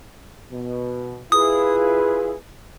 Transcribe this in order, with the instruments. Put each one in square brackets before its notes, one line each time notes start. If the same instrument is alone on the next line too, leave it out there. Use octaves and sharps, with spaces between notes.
[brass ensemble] B2
[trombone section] E4 G#4 [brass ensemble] F4 B4 [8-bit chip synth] D#6